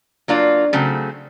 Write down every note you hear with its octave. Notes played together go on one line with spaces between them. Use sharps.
F#3 A#3 D4 F4
C#3 F#3 A3 C4